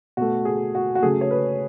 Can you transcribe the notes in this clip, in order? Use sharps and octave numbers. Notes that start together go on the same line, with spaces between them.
B2 A3 F#4
G#4
F#4
F#4
C#3 F#3 A3 G#4
C#5
B4